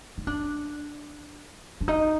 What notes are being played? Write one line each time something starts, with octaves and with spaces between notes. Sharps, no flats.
D#4
D4
D4
D#4